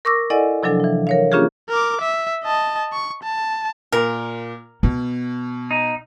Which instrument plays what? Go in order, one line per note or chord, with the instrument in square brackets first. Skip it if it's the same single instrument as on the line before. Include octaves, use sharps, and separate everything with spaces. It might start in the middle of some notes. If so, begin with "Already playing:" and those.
[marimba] A#4 C#6 D6 E6 A#6
E4 A4 D5 D#5 F#5 G#5
C3 F3 F#3 D4 A4
E3 F3
A#4 C#5 F5
A#3 C#4 D4 F4 G4 G#4
[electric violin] A#4 D6
E5
D#5 A5
C#6
A5
[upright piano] A#2 [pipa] A#4
[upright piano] B2 [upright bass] B3
[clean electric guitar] D#4